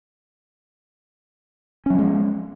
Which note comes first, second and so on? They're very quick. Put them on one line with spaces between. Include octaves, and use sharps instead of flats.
C#4 F#3 F3 G#3